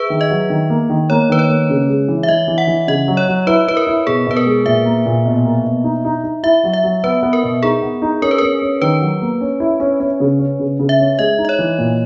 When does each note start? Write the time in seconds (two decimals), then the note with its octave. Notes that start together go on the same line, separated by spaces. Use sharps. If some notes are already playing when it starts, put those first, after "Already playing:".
Already playing: G#4 B4 E5
0.10 D#3
0.21 D#5
0.30 F#3
0.50 D#3
0.70 A#3
0.90 D#3
1.10 A#3 C#5
1.29 D#3 B4
1.39 C#5
1.49 A#3
1.70 C#3
1.88 G#3
2.08 E3
2.23 E5
2.28 E3 D#5
2.48 E3
2.58 F#5
2.68 E3
2.88 C#3 D#5
3.08 F#3
3.17 C#5
3.28 F#3
3.47 E4 B4
3.67 E4 B4
3.77 A#4
3.87 E4
4.07 B2 G#4
4.27 B2 B4
4.36 A#4
4.46 G#3
4.65 A#2 E5
4.85 A#3
5.06 A#2
5.25 B2
5.45 A#3
5.64 B2
5.84 D#4
6.05 D#4
6.24 D#4
6.43 E4 E5
6.64 F#3
6.73 E5
6.84 F#3
7.04 B3 B4
7.23 B3
7.33 A#4
7.43 B2
7.63 D#4 G#4
7.82 B3
8.02 D#4
8.22 C#4 A#4
8.31 B4
8.38 C#4 A#4
8.62 C#4
8.82 D#3 B4
9.01 F#3
9.22 A#3
9.41 C#4
9.60 E4
9.80 C#4
10.00 C#4
10.20 C#3
10.39 C#4
10.59 C#3
10.79 C#3
10.89 E5
11.00 C#4
11.19 G#3 D#5
11.38 D#4
11.45 D#5
11.49 C#5
11.59 E3
11.78 A#2